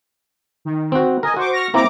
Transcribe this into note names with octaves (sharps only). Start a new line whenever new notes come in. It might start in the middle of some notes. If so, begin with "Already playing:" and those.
D#3
C4 F#4
A#4 D#5 G#5
F#4 C5 C#6 D6
C#6 F6 A#6
A#3 C4 E4 A#5 D6